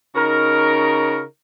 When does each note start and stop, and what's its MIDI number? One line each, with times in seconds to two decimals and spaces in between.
0.15 1.23 49
0.15 1.23 63
0.15 1.23 66
0.15 1.23 70